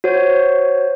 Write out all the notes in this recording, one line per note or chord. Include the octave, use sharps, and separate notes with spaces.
F#4 C5 C#5